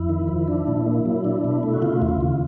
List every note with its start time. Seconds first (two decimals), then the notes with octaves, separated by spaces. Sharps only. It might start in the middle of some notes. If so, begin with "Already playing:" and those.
Already playing: F2 E4
0.09 D#3
0.28 F3
0.48 D4
0.67 A#2
0.86 A#3
1.06 F#3
1.24 D4
1.44 B2
1.63 A3
1.74 F#4
1.82 C#3 F4
2.01 D#2 E4
2.08 F4
2.21 D#2